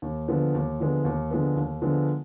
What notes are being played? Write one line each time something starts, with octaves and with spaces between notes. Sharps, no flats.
D#2
D3 F3 G#3 B3
D#2
D3 F3 G#3 B3
D#2
D3 F3 G#3 B3
D#2
D3 F3 G#3 B3